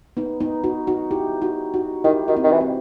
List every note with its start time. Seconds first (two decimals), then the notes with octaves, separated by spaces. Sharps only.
0.17 B3 D#4
0.40 B3 D#4
0.64 D#4 F#4
0.87 D#4 F#4
1.11 E4 G4
1.42 D#4 F#4
1.74 D#4 F#4
2.04 D#3 E4 G4
2.28 D#3 F#4
2.36 C4 E4
2.43 D#3
2.52 E3
2.61 C4